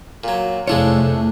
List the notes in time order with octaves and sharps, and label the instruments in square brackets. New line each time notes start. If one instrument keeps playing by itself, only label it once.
[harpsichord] A#2 F#3
[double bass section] F2 A3 [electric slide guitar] C3 E4 C#5 [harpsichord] G#3 D4 F4